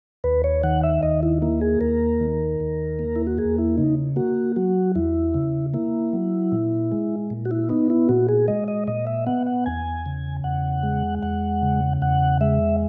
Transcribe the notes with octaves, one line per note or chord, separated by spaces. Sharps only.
D#2 B4
C#5
D#3 F#5
E5
D#2 D#5
E4
A#3 E4
G#4
D#2 A#4
D#3
D#2
A#3
E4
F#4
E2 G#4
E4
C#3 D#4
A#3 F#4
F#3 F#4
E2 E4
C#3
A#3 E4
F#3
A#2
G#3
A#2
F#4
E4
B3 D#4
E4
A#2 F#4
G#4
G#3 D#5
D#5
A#2 D#5
E5
B3 F#5
F#5
E2 G#5
C#3
E2 F#5
G#3
E2 F#5
C#3
E2 F#5
G#3 E5